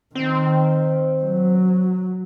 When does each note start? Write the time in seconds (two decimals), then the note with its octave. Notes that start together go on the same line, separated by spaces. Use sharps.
0.15 D#3 C4
1.23 F#3